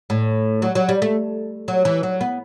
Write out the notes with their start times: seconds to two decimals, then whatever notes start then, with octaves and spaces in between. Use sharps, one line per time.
0.10 A2
0.62 F#3
0.75 F#3
0.89 G3
1.02 A3
1.68 F#3
1.85 E3
2.03 F#3
2.21 B3